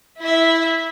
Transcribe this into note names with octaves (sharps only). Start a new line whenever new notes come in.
E4 E5